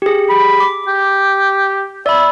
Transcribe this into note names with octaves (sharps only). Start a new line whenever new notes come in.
G4 G#4
B5
D6
G4
D5 E5 B5